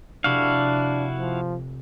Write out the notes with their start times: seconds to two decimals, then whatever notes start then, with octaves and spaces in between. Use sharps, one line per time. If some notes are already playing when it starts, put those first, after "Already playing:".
0.24 F1 C3 D4 E4 F#4 G4 F5
1.19 F3